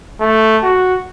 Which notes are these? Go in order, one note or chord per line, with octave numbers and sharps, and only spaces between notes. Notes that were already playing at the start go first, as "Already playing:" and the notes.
A3
F#4